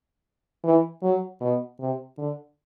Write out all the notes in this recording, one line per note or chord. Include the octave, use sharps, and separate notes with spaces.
E3
F#3
B2
C3
D3